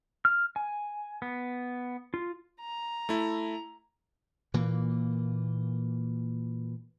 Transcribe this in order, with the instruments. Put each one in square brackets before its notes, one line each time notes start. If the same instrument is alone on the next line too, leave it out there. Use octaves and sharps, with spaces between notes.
[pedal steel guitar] F6
G#5
B3
F4
[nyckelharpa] A#5
[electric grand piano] A3 E4
[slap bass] A#2 E3 A#3